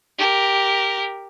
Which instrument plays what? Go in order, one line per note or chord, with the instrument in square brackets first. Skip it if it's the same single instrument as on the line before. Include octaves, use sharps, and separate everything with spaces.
[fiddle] G4 A#4